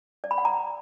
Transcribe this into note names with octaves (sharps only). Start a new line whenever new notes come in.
D5
B5
F#5
A#5